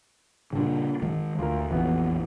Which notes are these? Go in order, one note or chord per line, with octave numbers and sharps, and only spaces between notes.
G2 A#2 C#3 D4
D#3 G#3
D2 F4 A#4
A#1 F2 E3 B3